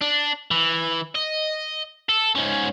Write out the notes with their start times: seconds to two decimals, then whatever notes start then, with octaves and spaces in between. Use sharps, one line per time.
0.02 D4
0.51 E3
1.15 D#5
2.09 A4
2.35 G#2 C#4